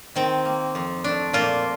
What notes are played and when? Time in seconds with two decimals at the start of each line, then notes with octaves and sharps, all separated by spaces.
0.16 D#3 C4
0.45 A#3
0.75 F2
1.04 A3 D4
1.33 A#2 F4